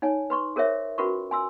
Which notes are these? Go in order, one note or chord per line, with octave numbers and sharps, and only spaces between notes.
D#4 C#5 G#5
B4 C6 C#6
G#4 A#4 C5 C#5 E5
C#4 F4 F#4 A#4 B4 C#6
G#5 C6 E6